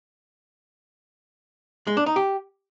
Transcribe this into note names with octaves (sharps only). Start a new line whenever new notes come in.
G#3
D4
D#4
G4